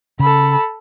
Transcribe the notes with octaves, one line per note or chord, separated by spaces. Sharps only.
C#3 A4 B5